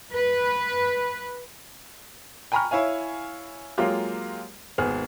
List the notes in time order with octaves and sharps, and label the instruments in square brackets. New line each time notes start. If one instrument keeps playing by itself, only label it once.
[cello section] B4
[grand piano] G5 G#5 A#5 B5 C#6 F6
E4 C#5 F5 G#5
F#3 G#3 A#3 F4 G4
G#1 D#2 B3 G#4 F6